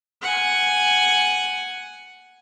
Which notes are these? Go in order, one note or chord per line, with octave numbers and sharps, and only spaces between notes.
F#5 G#5